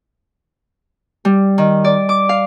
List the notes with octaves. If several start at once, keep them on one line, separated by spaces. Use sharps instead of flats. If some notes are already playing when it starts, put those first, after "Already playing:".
G3
D#3
D5
D6
F5